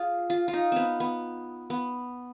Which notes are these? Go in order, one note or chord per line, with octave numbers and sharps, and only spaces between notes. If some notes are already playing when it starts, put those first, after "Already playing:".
Already playing: F4 G#4
F4
F4
D#4
B3 C4
B3
B3